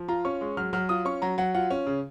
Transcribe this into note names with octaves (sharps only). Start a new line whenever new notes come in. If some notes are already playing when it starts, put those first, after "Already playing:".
Already playing: F3
F4 A#5
C#4 C#6
G#3
F#3 F6
F#3 F6
F4 D#6
C#4 C#6
F#3 A#5
F#3 F#5
F4 F#5
C#4
C#3